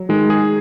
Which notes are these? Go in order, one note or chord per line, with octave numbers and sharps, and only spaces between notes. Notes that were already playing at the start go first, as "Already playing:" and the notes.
Already playing: F#3
D#3 G#3
G#4